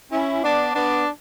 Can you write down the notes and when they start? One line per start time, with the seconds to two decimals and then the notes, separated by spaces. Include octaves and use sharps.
0.11 C#4 E4
0.43 B3 D4
0.74 B3 D4